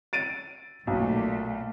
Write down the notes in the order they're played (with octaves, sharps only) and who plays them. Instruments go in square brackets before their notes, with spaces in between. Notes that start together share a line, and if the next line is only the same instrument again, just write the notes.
[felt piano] A6 D7 D#7
[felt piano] B1 [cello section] A#2 A3